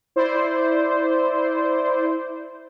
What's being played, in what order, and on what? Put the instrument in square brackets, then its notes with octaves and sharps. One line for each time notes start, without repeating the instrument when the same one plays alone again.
[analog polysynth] E4 C5 D5